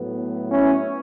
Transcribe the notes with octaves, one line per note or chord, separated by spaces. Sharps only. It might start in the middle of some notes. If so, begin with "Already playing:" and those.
Already playing: A2 F#3 B3
C#4 E4